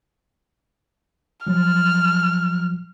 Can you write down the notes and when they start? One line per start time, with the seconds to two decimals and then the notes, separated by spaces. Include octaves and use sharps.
1.47 F3 F#3 F6